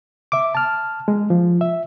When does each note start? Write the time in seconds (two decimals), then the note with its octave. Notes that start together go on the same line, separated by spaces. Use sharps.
0.32 E5 D6
0.55 A5 F6
1.08 G#3
1.30 F3
1.61 E5